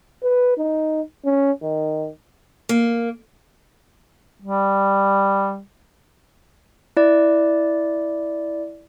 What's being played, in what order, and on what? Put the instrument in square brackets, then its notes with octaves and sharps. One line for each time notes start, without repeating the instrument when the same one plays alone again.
[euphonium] B4
D#4
C#4
D#3
[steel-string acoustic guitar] A#3
[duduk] G3
[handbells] E4 D5